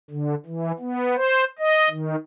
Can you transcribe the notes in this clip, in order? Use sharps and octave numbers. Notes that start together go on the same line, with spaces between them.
D3
E3
B3
C5
D#5
D#3